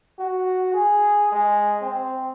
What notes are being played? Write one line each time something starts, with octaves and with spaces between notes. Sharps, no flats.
F#4
G#4
G#3
C4